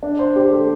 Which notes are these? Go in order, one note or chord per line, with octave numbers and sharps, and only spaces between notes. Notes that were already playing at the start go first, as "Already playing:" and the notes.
D4
C5
G4
A3